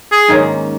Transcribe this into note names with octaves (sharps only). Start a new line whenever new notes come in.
G#4
G#2 D#3 A#3 C#4